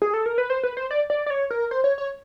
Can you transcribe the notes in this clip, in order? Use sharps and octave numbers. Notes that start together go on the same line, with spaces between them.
G#4
A4
A#4
B4
C5
B4
C5
D5
D5
D5
C#5
A#4
C5
C#5
C#5